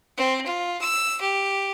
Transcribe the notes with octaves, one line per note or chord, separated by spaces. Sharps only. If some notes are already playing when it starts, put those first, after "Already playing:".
C4
F4
E6
G4